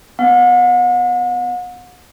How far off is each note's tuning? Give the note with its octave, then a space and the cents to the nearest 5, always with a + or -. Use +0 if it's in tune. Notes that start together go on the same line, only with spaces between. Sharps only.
B3 +25 F#5 -40